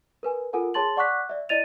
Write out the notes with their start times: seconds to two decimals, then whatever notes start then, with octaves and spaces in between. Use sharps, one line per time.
0.23 A#4 B4 G#5
0.53 F4 A4 A#4 F#5 G#5
0.74 G#4 C#5 A5 C6 A6 F#7
0.97 D5 F#5 C#6 D6 F#6 B6
1.29 D5 E5
1.49 E4 D5 D#5 A6 D#7 F7